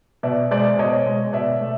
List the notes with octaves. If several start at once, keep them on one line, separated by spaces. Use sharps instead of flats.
B2 D5 E5
G#3 C5 D5
B2 C#5 D#5
G#3
B2 D5 E5
A3